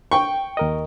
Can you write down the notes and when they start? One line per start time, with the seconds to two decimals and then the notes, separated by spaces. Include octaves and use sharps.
0.12 G5 C#6
0.57 D#2 A#4 D#5